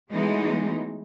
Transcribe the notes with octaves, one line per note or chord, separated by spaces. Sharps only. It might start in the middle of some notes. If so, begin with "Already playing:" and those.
E3 F#3 G#3 A3 B3 D#4